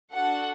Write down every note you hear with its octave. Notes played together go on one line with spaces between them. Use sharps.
D4 F#4 A4 F#5